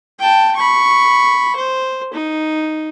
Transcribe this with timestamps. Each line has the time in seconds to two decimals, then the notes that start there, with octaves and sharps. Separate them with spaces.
0.19 G5 A5
0.56 B5 C#6
1.56 C5
2.14 D#4